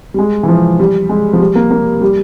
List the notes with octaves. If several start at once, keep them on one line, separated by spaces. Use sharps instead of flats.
G3
G#3
E3
F3
G3
G#3
F3
G3
A#3
A#3
G3